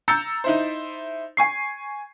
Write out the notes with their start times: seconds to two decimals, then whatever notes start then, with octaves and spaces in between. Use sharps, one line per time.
0.08 A#5 E6 G6 A6 C#7
0.44 D#4 E4 C5
1.37 G#5 C#6 C7